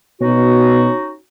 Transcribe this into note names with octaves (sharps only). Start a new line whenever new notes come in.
B2 C#4 D#4 F#4